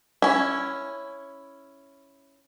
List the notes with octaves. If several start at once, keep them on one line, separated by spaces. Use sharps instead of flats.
C#4 E4